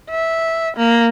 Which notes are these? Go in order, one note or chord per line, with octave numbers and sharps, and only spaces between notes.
E5
A#3